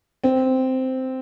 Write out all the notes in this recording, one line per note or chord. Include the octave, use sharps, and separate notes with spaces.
C4